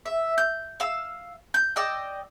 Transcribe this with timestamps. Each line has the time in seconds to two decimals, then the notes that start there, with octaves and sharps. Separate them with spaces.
0.06 E5
0.38 G6
0.80 F5 E6
1.54 G6
1.76 D5 D#5 G5 E6